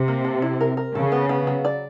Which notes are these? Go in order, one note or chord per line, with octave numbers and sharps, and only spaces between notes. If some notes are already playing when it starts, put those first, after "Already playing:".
Already playing: C3
A#3
A4
E4
A#4
A#4
C#3 A4
B3
B3
F#3
D5